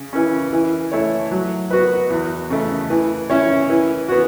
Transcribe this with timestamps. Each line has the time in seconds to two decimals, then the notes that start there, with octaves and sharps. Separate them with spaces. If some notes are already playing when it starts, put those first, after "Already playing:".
Already playing: C#3
0.13 E3 C#4
0.53 E3
0.92 A3 E4 C#5
1.31 F#3
1.71 B3 F#4 B4
2.10 E2
2.50 C#3 A3
2.90 E3
3.30 C#4 E4 C#5
3.69 E3
4.08 B3 F#4